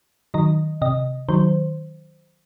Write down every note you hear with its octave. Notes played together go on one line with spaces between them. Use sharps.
D#3 F#3 D#5
C3 D#5
D#3 F#3 C5